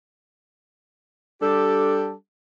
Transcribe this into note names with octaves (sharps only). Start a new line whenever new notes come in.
G3 D4 G4 A4